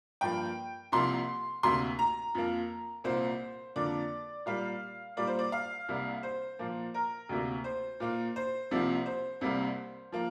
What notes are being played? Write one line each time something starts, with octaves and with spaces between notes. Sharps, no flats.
G2 F3 A#3 G5
C2 C3 F3 A#3 C6
D2 C3 A#3 C6
A#5
F2 F3 A#3
C2 A#2 A#3 C5
F2 D3 A#3 D5
A#2 G3 A#3 F5
A#2 G3 A#3 D5
C5
D5
F5
C2 C3 G3 A#3
C5
A#2 F3 A#3
A#4
D2 C3 A#3
C5
A#2 A#3
C5
C2 C3 F3 A#3
C5
C2 C3 G3 A#3
F3 A#3